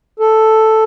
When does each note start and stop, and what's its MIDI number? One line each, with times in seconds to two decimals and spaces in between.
0.20 0.84 69